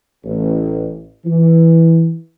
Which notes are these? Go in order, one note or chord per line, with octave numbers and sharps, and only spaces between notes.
A1
E3